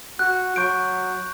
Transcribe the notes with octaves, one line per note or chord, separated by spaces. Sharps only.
F#4 F#6
F#3 C#6 G6 D7